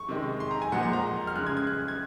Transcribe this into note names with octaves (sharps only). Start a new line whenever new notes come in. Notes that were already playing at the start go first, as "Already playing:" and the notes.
Already playing: C#6
C3 D#3 G#3
C6
A#5
G#5
A#2 F3 G#3 F#5
F#5
A#5
F6
C#3 G#3 F#6
G#6
G#6
F#6
G#6